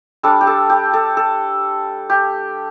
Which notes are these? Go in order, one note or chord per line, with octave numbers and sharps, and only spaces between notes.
G3 D4 A4
G4
A4
G4
A4
A4
G4